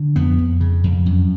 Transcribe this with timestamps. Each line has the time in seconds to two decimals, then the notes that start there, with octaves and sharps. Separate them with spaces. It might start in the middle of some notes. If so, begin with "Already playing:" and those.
Already playing: D3
0.16 F2 B3
0.38 F2
0.61 C#3
0.84 F2
1.06 F#2